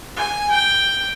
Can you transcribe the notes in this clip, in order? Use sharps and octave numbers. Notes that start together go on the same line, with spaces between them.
G#5
G5